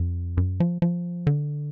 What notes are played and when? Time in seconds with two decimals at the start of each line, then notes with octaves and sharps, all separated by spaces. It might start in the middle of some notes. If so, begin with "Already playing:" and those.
Already playing: F2
0.37 F#2
0.60 F3
0.82 F3
1.27 D3